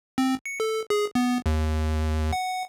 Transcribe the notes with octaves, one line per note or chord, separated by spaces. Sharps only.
C4
C#7
A4
G#4
B3
D#2
F#5